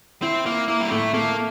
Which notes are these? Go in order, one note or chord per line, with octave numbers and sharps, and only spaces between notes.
C4 E4
A#3 E4
A#3 E4
G3
A2 A3
A3 A#3